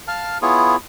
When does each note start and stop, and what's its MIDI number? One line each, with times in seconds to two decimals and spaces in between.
0.08 0.38 77
0.08 0.38 81
0.08 0.38 89
0.42 0.76 59
0.42 0.76 64
0.42 0.76 65
0.42 0.76 68
0.42 0.76 73